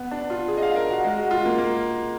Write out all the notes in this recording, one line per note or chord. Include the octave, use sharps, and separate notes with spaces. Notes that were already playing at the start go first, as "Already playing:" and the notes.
Already playing: B3
D4
F4
G#4
D#5
F5
A#4
F#4
G#3
F#4
F4
A#3
A#3